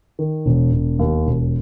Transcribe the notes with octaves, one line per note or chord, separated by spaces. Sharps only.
D#3
E1
E1
D#2
E1